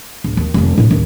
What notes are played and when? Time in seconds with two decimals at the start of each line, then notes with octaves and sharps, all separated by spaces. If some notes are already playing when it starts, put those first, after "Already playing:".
0.24 D1
0.37 D#2
0.54 F1 D#2
0.78 A2 E4
0.91 A1 D#2